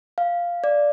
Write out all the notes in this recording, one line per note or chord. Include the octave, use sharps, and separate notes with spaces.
F5
D5